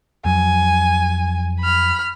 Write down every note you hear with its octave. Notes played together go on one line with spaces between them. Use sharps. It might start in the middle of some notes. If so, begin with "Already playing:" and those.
F2 F#3 G#5
B5 F6